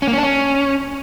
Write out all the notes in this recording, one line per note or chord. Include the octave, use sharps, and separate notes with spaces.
C#4
A#3
C#4
D4
C#4